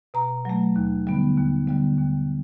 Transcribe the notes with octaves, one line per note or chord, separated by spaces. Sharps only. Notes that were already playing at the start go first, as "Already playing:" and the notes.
B2 A#5
F#3 A3
D#2
D3 G3 B3
D#2
D3 G3 B3
D#2